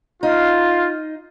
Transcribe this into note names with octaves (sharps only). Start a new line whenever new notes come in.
D#4 F4